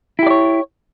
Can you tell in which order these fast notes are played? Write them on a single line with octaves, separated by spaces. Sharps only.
E4 G4 D5 C#5